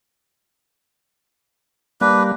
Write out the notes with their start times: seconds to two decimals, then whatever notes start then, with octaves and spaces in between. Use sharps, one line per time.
2.01 G3 A#3 D4 B4